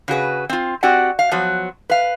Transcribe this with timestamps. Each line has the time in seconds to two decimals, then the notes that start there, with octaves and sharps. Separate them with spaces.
0.08 C#3 F#4 G#4 B4
0.49 C4 F4
0.83 C4 F#4 G4 D5 F#5
1.19 F5
1.31 F3 F#3 B3
1.90 B4 F5